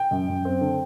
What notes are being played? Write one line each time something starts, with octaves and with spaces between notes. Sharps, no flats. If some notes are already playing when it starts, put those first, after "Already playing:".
Already playing: G5
F#2
F#2
C4
D3